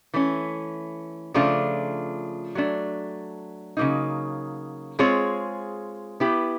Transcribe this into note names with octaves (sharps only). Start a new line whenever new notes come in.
E3 A3 C#4
C#3 F3 A3 D4 F4
F#3 A3 D4
C#3 F#3 A#3 D#4
G#3 C4 F4 G#4 C#5
B3 E4 G4 B4